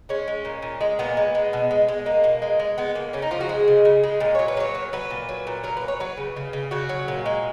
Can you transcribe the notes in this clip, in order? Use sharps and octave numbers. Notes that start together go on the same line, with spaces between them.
G#3 C#4
G#3
A#2
A#2
G#3
A#2 B3
G#3
G#3
B2
G#3
G#3
B2 A#3
B2
G#3
G#3
G#3 B3
C#3 A#3
C#3 C#4
D#4
F3 F4
F#4
G#3 G#4
C#3
C#3
G#3
A#2
F#3 C#5
B4
F#3 C#5
A#2
F#3 B4
A#2
F#3
A#2
F#3 A#4
B4
F#3
C#5
F#3 B4
C#3
C#3
C#3
C#3 F#4
F#3
A#2
G#3